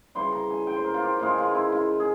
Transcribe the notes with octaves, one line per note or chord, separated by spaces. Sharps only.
C#3 E3 G3 C6
A#5
G#5
G5
C5
A#4
F4
G4
C#3 E3 G#3 F4
F4
E4
F4
G#4